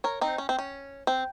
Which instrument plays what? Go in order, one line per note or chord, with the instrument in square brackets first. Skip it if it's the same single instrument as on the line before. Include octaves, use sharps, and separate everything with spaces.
[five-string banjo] A#4 C#5
C4 D#4
C#4
C4
C#4
C4